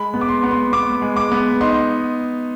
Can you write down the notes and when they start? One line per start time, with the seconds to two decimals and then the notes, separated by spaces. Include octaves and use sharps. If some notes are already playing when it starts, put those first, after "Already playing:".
Already playing: G#3 B5
0.14 B3
0.21 D6
0.29 C6
0.43 B3
0.51 C6
0.73 B3 D6
1.02 G#3
1.17 D6
1.32 B3
1.61 D#4 C6